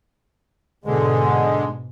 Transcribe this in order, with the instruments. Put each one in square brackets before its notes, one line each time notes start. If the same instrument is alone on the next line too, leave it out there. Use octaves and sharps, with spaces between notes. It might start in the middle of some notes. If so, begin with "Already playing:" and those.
[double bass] G#2 B2 [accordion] D3 G#3